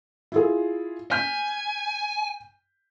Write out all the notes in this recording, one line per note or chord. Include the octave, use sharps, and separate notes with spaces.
E4 F4 G#4
G#5 F6 G6 B6